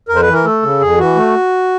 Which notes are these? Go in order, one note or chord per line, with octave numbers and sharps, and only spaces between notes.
F2 A#4
C5
B4
E3
A#4
A3 A4
C#3
F2 G#4
E3 F#4
A3